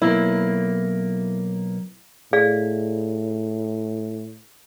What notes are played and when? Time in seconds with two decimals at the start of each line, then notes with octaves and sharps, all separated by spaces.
0.02 B1 A#3 E4
2.33 A2 G#4 D5 F5